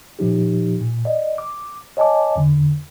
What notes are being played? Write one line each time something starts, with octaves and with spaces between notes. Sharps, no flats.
A#2 F3 D#4 G4
A#2
D5 D#5
D6
C#5 D#5 G#5 A5 D6
E2 D3